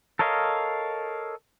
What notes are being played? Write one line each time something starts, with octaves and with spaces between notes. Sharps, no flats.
A4 A#4 C#5 D#5 F5